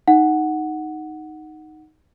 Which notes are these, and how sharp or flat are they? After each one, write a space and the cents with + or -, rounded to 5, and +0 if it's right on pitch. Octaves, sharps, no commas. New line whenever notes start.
D#4 +0 F#5 +0